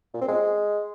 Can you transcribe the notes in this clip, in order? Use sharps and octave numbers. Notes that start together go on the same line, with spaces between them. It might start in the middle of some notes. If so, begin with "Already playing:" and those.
A#2
C4
G#3